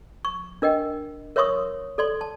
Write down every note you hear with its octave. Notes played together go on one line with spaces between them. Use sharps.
C#6
D4 A#4 D#5 G5
A#4 C#5 E5 C6 C#6 D#6
A4 D5 C6
A5